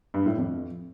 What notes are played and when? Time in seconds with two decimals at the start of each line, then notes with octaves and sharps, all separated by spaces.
0.14 G2
0.26 A2
0.38 F2